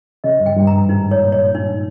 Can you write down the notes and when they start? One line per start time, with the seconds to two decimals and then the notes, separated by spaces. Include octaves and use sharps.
0.24 C#3 D#5
0.40 G2
0.46 G5
0.57 G2
0.67 A#5
0.73 G#2
0.89 G#2 D#4
1.11 C#5
1.22 A#2
1.32 C#5
1.55 D#4